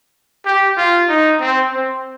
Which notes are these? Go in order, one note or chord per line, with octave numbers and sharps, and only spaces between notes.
G4
F4
D#4
C4
C4